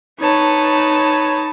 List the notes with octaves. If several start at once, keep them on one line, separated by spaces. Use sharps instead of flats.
D#4 B4 C#5 A5